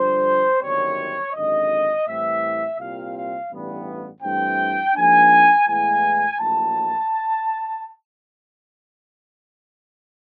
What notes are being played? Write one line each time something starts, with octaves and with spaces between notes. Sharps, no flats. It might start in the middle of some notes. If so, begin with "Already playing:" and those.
Already playing: G2 D3 F3 C5
G1 F#2 D#3 G3 C4 C#5
G#1 F#2 D3 D#5
A2 E3 G3 C4 E5
C2 A#2 G3 C4 F5
F5
A1 G2 E3 G3 B3
G2 E3 A3 C4 G5
G#2 F3 A#3 D4 G#5
A2 E3 G#3 B3 G#5
A#1 A2 F#3 A#3 A5